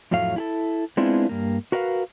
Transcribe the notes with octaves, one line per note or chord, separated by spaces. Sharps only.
F2 A2 F#3 A3 F5
E4 G#4 A4
G#3 B3 C4 D4 E4 F4
G2 A#3
F#4 A#4 B4 E5 F5